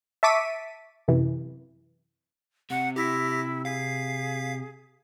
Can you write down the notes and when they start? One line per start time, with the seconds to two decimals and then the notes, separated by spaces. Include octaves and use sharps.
0.23 E5 A5 C#6 D6 B6 D#7
1.08 F#2 C3 E3
2.70 C3 F#5
2.96 E4 G4 A#6 B6
3.65 G#4 F5 B6 C7